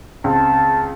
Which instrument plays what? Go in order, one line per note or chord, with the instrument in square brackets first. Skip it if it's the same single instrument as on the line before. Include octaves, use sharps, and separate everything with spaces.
[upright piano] C#2 C4 [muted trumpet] A5